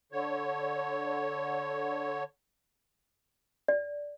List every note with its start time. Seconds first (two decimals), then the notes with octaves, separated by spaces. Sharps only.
0.12 D3 C#5
3.68 D5